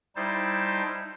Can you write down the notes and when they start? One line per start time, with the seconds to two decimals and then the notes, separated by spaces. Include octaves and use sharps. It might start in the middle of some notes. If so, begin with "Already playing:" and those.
0.16 G3 D#4 E4 C5 A5